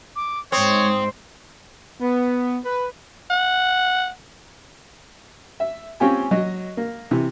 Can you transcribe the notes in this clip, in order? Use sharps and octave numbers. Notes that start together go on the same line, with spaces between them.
D6
G#2 G#3 C4 C#5 D#6
B3
B4
F#5
E5
C4 C#4 F4 G4 G#5
F#3 D#5
A#3
C3 E3